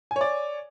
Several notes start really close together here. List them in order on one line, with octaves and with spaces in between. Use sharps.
G#5 C#5 D5